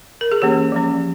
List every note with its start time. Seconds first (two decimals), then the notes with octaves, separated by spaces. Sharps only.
0.21 A#4
0.32 G#4
0.42 E3 A#3 C#4 G4
0.72 F3 G#3 C#4